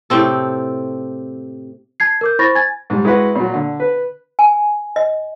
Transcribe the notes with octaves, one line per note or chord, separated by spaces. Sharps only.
A2 C3 C4 A4
A5 G#6 C7
A#4 D6 G6
E4 C5 B5 C#6 A6 A#6
G#5 G#6 A6
G#2 G3
G#3 E4 F#4 B4 F#5
A#2 F#3
D3
B4
G#5
D#5